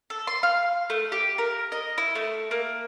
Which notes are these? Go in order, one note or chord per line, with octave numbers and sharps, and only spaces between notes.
A4
C6
F5
A3
G4
A#4
D#5
E4
A3
A#3